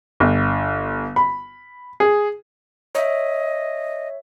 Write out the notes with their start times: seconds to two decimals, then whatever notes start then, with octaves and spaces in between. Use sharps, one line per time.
0.20 G1
1.16 B5
2.00 G#4
2.95 C#5 D#5 E5